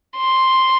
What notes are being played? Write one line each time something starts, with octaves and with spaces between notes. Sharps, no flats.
C6